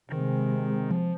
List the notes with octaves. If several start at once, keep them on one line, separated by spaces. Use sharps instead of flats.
C3 D#3 G#3 C4
F3